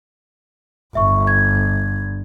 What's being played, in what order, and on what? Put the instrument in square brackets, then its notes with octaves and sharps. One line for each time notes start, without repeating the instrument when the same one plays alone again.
[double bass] G1 [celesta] E5 C#6
[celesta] G#6